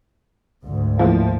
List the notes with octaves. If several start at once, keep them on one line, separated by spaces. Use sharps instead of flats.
D2 G#2
A2 F3 A#3